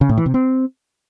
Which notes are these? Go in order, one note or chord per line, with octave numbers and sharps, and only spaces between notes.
C#3
A2
E3
C3
C4